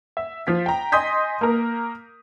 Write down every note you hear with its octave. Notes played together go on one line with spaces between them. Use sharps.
E5
F3 F4 B6
G5 A#5
D#5 G#5 C6 D#6 G6 B6
A#3 A#4